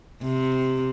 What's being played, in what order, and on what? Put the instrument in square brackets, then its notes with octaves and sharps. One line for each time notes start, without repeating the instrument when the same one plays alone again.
[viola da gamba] C3